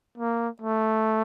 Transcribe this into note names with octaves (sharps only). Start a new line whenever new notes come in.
A#3
A3